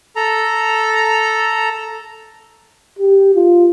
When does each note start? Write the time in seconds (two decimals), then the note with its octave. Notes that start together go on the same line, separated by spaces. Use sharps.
0.16 A4 A#5
2.99 G4
3.35 F4